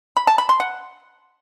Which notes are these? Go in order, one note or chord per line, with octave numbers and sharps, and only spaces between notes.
B5
A5
B5
C6
F#5